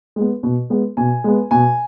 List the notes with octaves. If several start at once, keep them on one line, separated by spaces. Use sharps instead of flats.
G#3 B3
B2
G#3 B3
B2 G#5
G#3 B3
B2 G#5